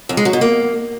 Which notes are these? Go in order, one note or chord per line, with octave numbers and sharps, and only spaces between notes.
F2
G#3
F#3
B2
A#3